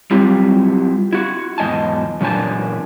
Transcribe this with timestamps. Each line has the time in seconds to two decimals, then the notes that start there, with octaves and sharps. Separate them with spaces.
0.11 F#3 G3 C4 E4 F4 G4
1.13 E4 F#4
1.58 E2 G#2 A#3 D#5 G#5 A5
2.21 F#2 A#2 E3 D4 G#5 A5